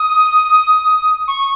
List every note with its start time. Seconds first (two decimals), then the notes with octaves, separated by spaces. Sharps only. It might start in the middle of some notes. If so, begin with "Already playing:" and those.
Already playing: D#6
1.28 C#6